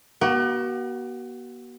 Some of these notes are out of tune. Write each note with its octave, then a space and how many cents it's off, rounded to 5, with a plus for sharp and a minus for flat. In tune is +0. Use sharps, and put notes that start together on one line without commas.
B3 -45 F#4 +35